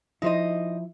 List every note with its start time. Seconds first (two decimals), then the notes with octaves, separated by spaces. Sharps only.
0.22 F3 D#4 E4 C5 D#5